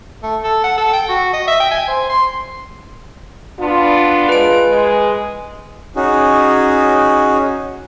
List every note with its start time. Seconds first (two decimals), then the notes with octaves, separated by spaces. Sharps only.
0.23 A3
0.44 A4
0.64 F#5
0.78 A4
0.93 G5
1.09 F#4
1.33 D#5
1.48 E5
1.60 G5
1.71 G#5
1.88 C5
2.10 C6
3.60 B3 D4 F4
4.29 G#3 F4 B4 D7
4.68 G#3
5.96 C#4 D#4 F#4 G#4